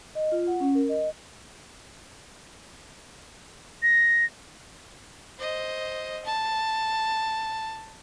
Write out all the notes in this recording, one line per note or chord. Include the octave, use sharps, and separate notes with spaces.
D#5
F4
F#5
C#4
A#4
D#5
A#6
C5 D#5
A5